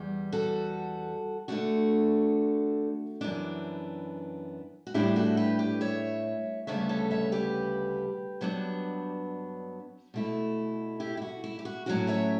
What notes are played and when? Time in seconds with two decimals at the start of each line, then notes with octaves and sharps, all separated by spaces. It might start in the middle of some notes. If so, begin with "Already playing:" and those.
Already playing: E2 G3
0.32 F#4 A4
1.48 D3 A3 D4 F#4
3.21 F#2 E3 B3 D4
4.87 F#4
4.94 A2 G3 D4 E4 G4
5.16 F#4 A4
5.37 G4 B4
5.59 G4 B4
5.81 C#5 E5
6.67 D2 C#3 G3 B3 C#5 E5
6.89 A4 C#5
7.11 C#5 E5
7.32 G4 B4
8.41 G2 F#3 B3 D4
10.14 B2 A3 E4
11.00 E4 G4
11.17 E4
11.22 F#4
11.44 E4
11.59 G4
11.65 F#4
11.86 A2 F#3 C#4 E4 F#4
12.08 C#5 E5